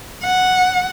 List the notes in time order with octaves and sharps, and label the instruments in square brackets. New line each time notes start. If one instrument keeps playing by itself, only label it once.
[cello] F#5